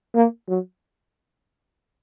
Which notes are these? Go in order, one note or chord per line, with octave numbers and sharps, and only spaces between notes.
A#3
F#3